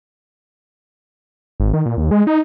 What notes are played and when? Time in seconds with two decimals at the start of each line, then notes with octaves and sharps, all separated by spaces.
1.60 G#1
1.74 D#3
1.86 A#2
1.97 D#2
2.11 G#3
2.27 D#4